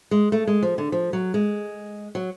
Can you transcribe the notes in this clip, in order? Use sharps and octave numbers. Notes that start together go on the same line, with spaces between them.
G#3
A3
G#3
F3
D3
F3
F#3
G#3
F#3